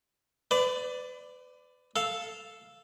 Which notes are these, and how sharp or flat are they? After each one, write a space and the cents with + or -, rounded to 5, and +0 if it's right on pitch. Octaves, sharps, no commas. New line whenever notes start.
B4 +35 D5 +0
A4 +0 F5 +0